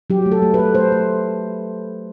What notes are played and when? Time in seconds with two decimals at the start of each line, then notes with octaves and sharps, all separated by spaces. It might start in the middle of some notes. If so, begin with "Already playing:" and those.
0.10 F#3 G4
0.26 A3
0.32 A4
0.42 A3
0.54 B4
0.59 A3
0.75 A3 C5
0.92 A3